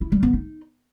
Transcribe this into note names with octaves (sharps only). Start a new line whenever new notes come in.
E4
G3
B3
D#4